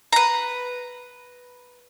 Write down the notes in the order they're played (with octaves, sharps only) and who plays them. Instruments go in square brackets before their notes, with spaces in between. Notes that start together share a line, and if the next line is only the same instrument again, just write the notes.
[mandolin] B4 A#5